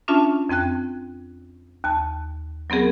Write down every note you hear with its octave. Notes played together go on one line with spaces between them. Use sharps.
C#4 D4 F4 E5 A5
F2 C4 G5 F#6
D#2 A5
F#3 B3 C4 G#4 A#4